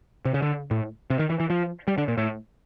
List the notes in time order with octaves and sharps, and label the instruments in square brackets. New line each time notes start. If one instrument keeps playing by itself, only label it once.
[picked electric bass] C3
C#3
D3
A2
C3
D#3
E3
E3
F3
G3
D3
A#2
A2